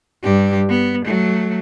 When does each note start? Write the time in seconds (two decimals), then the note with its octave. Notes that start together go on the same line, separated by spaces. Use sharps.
0.24 G2 G4
0.69 B3
1.05 F#3 A3